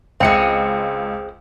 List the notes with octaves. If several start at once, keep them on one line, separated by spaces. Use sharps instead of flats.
C#2 G#3 C4 C#7